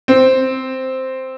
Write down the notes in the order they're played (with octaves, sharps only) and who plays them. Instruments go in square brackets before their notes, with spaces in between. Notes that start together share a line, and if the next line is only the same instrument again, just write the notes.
[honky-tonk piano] C4